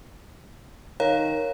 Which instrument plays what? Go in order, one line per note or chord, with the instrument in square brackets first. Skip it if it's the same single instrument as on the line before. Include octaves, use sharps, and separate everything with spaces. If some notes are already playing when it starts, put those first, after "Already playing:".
[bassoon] D#3 [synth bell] C#5 F5 A#5